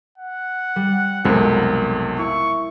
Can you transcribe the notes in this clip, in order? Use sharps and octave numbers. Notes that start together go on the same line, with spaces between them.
F#5
G3
B1 F2 C3 G#3 A#4
E4 C#6